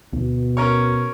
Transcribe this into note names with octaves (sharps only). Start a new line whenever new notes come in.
D2 B2
C#4 A#4 C#5